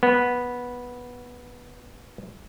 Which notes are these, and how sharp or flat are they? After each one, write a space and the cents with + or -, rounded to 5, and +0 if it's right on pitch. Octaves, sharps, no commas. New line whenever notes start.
B3 -10